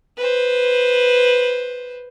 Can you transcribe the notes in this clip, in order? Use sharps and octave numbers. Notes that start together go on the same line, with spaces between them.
B4 C5